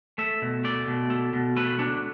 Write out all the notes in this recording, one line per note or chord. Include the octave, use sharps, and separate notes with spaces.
A3 E5
B2
A3 D5
B2
A3
B2
A3 B4
A3 D4